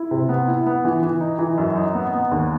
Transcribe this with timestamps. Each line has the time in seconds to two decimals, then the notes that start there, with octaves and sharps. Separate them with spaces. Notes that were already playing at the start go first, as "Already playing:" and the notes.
Already playing: E4
0.11 C3
0.29 B3
0.48 E4
0.66 B3
0.85 E3
1.03 E3
1.21 D#4
1.39 E3
1.58 F#2
1.75 D#4
1.95 B3
2.12 B3
2.31 D#2